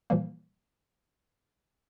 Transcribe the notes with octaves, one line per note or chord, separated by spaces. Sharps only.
A#2 E3 F3 G3 A#3